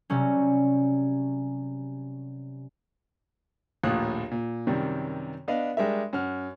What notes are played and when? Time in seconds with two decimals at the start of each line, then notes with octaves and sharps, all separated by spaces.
0.10 C3 F#3 G3 C#4
3.83 A#1 D#2 A2 F4 D#6 F#6
4.31 A#2
4.67 F#2 C3 D#3 G3
5.48 B3 D4 D5 D#5 F5
5.77 G3 G#3 D4 G4 A#4 E5
6.13 F#2 F#5 F6